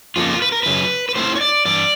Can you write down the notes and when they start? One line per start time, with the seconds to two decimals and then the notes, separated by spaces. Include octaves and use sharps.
0.16 F2 C#3 F3 A#3 D#4 F4
0.42 B4
0.52 A#4
0.63 F#2 C#3 B4
1.09 B4
1.15 A2 F#3 A3 C4 E4 C5
1.36 C#5
1.41 D5
1.65 G2 E3 D5